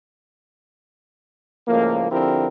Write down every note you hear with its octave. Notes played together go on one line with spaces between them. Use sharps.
C#2 A2 F3 A#3
D3 F3 C4 E4 G4 A#4